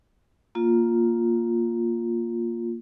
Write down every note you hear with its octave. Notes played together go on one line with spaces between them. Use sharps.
A#3 F4